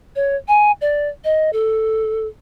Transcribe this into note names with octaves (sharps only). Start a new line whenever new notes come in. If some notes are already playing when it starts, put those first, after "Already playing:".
C#5
G#5
D5
D#5
A4